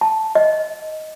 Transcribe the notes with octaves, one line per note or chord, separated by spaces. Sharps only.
A5
D#5